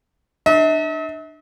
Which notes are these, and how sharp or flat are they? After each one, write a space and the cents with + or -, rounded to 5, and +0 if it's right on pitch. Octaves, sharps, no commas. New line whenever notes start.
D4 +30 E5 -45